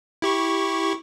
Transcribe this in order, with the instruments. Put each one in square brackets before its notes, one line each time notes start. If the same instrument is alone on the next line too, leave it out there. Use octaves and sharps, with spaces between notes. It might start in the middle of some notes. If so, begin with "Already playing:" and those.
[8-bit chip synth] E4 G4 C#6